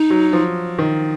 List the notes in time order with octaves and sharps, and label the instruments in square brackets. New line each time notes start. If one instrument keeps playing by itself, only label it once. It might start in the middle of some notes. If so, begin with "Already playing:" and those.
Already playing: [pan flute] D#4
[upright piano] F#3
F3
D#3